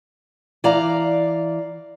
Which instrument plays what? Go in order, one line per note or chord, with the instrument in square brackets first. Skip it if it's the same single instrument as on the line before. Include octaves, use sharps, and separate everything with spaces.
[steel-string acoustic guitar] E3 D5 F5 A#5